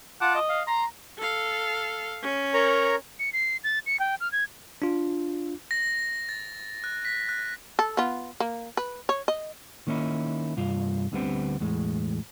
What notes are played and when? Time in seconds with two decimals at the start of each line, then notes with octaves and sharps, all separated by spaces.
0.21 F4 F#5 A5 D6
0.35 D#5
0.49 F5
0.67 A#5 C6
1.18 A4 F5
2.22 C#4
2.54 A#4 C#5 A#5
3.19 C#7
3.33 C7
3.64 A6
3.86 C#7
4.00 G5
4.20 F6
4.32 G#6
4.82 D4 F4
5.71 A#6
6.29 A6
6.84 F#6
7.05 B6
7.29 F#6
7.79 A4
7.97 B3 F4
8.40 A#3
8.77 B4
9.09 C#5
9.28 D#5
9.87 D#3 A#3 C#4 D#4 E4
10.57 C2 G2 F4
11.12 D2 D3 G3 B3 C4
11.60 E2 A2 G#3